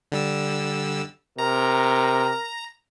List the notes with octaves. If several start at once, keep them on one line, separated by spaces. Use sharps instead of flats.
D3 G3 E6
C3 A#4 A#5